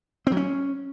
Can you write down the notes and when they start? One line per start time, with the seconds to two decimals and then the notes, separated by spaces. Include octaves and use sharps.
0.27 C4
0.32 F#3
0.37 C#4